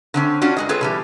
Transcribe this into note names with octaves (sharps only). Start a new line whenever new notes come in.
D3 C4 C#4
C#4 D4 F4 F#4
G2 G#3 D#5
C4 F4 G#4 A4 B4 C#5
B2 E3 G3